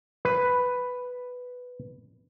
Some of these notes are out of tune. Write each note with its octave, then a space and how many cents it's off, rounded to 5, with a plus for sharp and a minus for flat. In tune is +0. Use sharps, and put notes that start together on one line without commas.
B4 +5